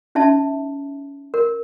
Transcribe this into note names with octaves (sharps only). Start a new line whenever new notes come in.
C#4 D#4 E5 A5
A#4